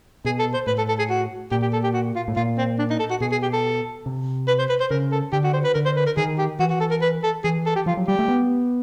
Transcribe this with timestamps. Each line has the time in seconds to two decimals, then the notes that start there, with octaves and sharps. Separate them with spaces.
0.25 B2 G#4
0.39 A4
0.54 C5
0.67 A2 B4
0.78 A4
0.88 A4
0.98 G#4
1.10 F#4
1.51 A#2 G4
1.62 G4
1.73 A4
1.84 G4
1.94 F#4
2.15 F4
2.28 A2
2.36 A#2 F4
2.57 C4
2.79 D4
2.90 D#4
2.99 A4
3.10 F#4
3.20 B2 G#4
3.32 G#4
3.42 G4
3.53 A4
4.06 C3
4.47 B4
4.59 C5
4.69 B4
4.80 C5
4.90 C#3 A#4
5.12 A4
5.32 D3 G4
5.44 F#4
5.53 C5
5.64 B4
5.74 D3 A#4
5.85 C5
5.96 B4
6.06 A#4
6.17 D#3 G#4
6.38 G4
6.59 E3 F#4
6.70 F#4
6.80 A4
6.91 A#4
7.02 B4
7.23 A4
7.44 E3 G#4
7.66 A4
7.76 G4
7.86 F3 F4
7.97 F#3
8.07 G3 G4
8.19 A3
8.28 B3